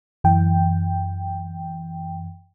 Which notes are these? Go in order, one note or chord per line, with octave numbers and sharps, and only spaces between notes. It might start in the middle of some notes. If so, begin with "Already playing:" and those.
F#2 E3 G5